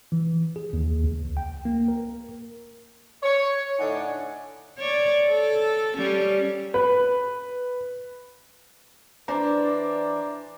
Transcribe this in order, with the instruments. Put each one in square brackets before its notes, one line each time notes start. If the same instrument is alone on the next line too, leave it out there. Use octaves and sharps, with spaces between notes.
[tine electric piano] E3
G#4
D#2
C#2
G5
A#3
A#4
[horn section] C#5
A2 D3 D4 D#4 F#5 G#5
[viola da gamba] C#5 D5
A4
G3 C#4
[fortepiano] B4
[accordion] E3 D5 [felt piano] D4 C5 A#5